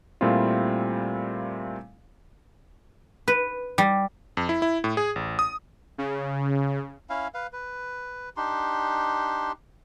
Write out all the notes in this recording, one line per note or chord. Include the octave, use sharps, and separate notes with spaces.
A#2 G3 A3 C4 E4 F4
B4
G3
F2
E4
E4
A2
G#4
A1
D#6
C#3
C#4 E4 F5
B4 F5
B4
D4 D#4 G4 C6